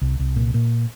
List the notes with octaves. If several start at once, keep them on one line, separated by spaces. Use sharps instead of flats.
C2
C2
A#2
A#2